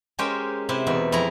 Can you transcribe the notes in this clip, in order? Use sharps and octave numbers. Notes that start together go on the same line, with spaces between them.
G#3 C#4 G4 A#4 C5 G5
C3 E4 C5
E2 B2 D#4 E5
F2 E4 G#4 A#5